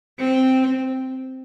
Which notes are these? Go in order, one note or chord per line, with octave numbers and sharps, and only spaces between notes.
C4